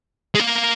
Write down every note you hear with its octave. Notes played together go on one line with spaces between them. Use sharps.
G#3
A#3